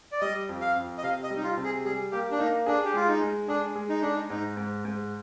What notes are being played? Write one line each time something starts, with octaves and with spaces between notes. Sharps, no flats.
D5
G3 D#5
F2
F5
F2
D#5
C3 F5
D#5
G3
D#4
F4
C3
G#4
G3 G#4
A#3 G4
D4
A#3 D#4
D4 G#4
G4
G#3 F4
D#4
G#3
D4 G#4
G#3
D#4
D4 G#4
D#4
G#2 D#4
G#2
G#2